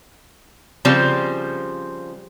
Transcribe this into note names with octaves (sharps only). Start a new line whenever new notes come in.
C#3 F3 G3 C4